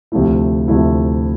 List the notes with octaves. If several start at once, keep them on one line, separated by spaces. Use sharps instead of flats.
D2 C3 F3 A3 E4
D2 C3 F3 A3 E4